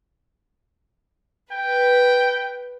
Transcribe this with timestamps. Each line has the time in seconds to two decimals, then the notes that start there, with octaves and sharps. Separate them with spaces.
1.52 B4 G5